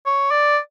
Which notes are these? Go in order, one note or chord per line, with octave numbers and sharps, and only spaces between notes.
C#5
D5